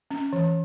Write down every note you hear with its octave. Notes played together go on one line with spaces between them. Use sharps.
C#4
E3